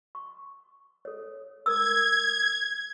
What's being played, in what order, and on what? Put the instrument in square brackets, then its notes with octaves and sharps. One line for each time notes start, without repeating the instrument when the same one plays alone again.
[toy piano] C#6
A4 C#5
[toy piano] A#4 D#6 E6 [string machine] G#6